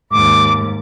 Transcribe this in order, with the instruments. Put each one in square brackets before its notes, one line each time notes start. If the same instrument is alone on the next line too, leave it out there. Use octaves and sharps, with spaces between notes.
[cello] D#2 G#2 [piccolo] D6